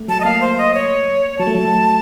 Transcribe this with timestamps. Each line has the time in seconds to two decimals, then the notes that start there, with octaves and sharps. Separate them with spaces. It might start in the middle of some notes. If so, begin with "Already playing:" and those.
Already playing: A3
0.08 F#3 A5
0.20 D#5
0.25 A#3 F5
0.41 C5
0.58 D#5
0.74 C#5
1.39 F#3 A5
1.47 A3
1.54 F#3